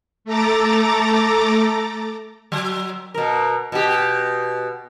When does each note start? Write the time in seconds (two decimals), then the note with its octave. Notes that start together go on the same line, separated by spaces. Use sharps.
0.25 A3 A4 A#5 D6 A6
2.52 F#3
3.14 B2 A#4
3.72 B2 G4